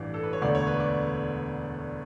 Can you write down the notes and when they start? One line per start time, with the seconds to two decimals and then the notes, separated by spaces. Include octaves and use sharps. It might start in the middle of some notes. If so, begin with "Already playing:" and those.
Already playing: A1 G2 E3 D5
0.14 A4
0.23 B4
0.33 C#5
0.42 E1 D2 D3 A3 D5
0.55 C#5
0.67 B4
0.80 D5